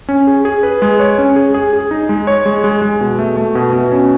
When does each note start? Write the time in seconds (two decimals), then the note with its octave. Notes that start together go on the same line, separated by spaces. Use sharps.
0.09 C#4
0.27 G#4
0.45 G#4
0.63 B4
0.82 G#3
1.00 C#5
1.18 C#4
1.36 G#4
1.54 G#4
1.73 G#4
1.91 D#4
2.09 G#3
2.27 C#5
2.46 G#3
2.64 G#3
2.82 G#3
3.01 B2
3.19 A3
3.37 A3
3.55 B2
3.73 B2
3.92 C#4